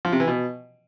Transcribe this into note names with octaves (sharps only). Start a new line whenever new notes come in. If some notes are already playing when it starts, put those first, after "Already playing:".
F3
C3
E3
B2